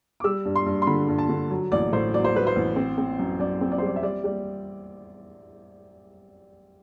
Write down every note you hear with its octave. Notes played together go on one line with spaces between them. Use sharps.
D6
G3 E6
G2
C6
G2
C6
D3 B5
G2
A5
D3
F#3
A1 D5
A2 C5
F#3 D5
C5
F#3 B4
C5
A1
C4
C4
F#2
F#2 D5
C4
D5
C5
G3 D5
E5
G3 D5
G3 D5